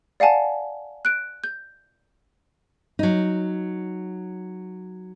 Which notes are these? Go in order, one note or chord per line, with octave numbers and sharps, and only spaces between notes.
D5 F5 F#5 G#5 A5
F#6 D7
G6
F#3 D#4